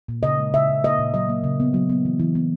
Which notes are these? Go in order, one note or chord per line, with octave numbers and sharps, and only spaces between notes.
A#2
C#3 D#5
G#3
C#3 E5
C#3
A#3 D#5
A#2
F#3 D#5
A#3
C#3
B3
F#3
B3
E3
E3
B3